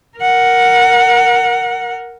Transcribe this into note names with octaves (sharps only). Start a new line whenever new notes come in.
A#4 F#5